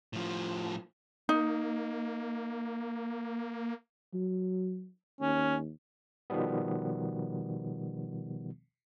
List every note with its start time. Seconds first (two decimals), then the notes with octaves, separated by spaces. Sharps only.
0.13 A2 F3
1.29 A#3 D#4
4.14 F#3
5.21 D#2 C#4
6.30 B2 D#3 F3 G3 B3